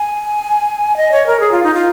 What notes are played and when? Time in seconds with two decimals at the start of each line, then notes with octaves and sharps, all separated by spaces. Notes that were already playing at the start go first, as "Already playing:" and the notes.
Already playing: G#5
0.97 D#5
1.12 C#5
1.27 A#4
1.40 G#4
1.51 F4
1.63 D#4
1.74 F4